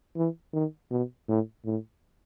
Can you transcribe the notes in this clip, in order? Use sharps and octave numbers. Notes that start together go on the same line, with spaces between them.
E3
D#3
B2
A2
A2